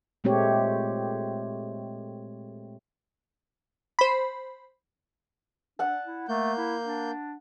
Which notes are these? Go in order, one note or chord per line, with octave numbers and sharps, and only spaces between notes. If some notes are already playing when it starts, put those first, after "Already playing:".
A#2 G#3 A3 C4 G4 C#5
C5 B5
D4 F#5 A5
E4
A3 A#3 G6
E4
D4